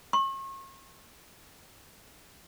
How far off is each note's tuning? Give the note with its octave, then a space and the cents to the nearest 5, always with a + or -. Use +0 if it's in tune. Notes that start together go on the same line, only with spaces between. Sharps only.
C#6 -40